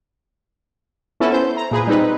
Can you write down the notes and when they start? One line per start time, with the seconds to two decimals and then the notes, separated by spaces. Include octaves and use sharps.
1.20 B3 C#4 E4 A4
1.32 C5 G6
1.57 A#5
1.71 A#2 G#4 B4
1.87 G3 C4 D#4 B4